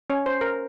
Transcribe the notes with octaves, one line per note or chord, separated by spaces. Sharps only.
C#4 C#5
C5
A#4